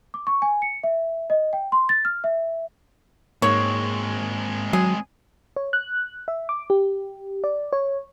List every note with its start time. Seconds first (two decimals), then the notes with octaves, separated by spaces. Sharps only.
0.14 D6
0.27 C#6
0.42 G#5
0.62 C#7
0.83 E5
1.30 D#5
1.53 G5
1.72 C6
1.89 A6
2.05 F6
2.24 E5
3.42 G#2 G#3 A#3 C4 C#5
4.73 F#3 G#4
5.56 C#5
5.73 F#6
6.28 E5
6.49 D6
6.70 G4
7.44 D5
7.73 C#5